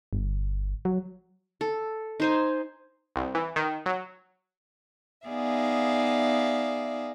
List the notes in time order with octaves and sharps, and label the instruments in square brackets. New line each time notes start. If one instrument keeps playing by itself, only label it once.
[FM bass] G1
F#3
[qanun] A4
D#4 C5 G#5
[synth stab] C2
E3
D#3
F#3
[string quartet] B3 D#4 G#4 D5 E5 F5